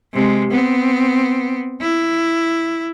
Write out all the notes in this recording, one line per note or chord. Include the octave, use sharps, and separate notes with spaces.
C3 G#3
B3 C4
E4